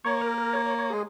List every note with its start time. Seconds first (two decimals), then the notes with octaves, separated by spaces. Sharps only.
0.05 A#3 C#5
0.21 A#4
0.38 A#4
0.53 C#5
0.66 C#5
0.78 C#5
0.90 G#3 G#4